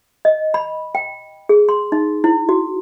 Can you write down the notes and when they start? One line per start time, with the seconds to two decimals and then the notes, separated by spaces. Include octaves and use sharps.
0.25 D#5
0.54 B5
0.95 G5
1.49 G#4
1.69 C6
1.92 D#4
2.24 E4
2.49 F#4